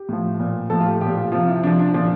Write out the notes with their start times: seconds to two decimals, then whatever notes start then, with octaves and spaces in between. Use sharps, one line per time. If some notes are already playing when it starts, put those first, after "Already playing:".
Already playing: G4
0.09 A2 F3
0.40 A#2 F3
0.70 A2 F3 A4
0.80 F4
0.86 G4
1.01 A#2 F3 G4
1.16 F4
1.32 C3 F3 F4
1.47 E4
1.63 C3 F3 D4
1.79 D4
1.94 A#2 F3 D4